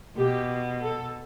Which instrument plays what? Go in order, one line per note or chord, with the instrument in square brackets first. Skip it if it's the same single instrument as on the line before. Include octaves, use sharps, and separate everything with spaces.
[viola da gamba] B2 [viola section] G4
[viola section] A4